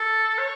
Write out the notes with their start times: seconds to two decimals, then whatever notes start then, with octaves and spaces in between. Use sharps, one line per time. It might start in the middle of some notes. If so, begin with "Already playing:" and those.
Already playing: A4
0.38 C#5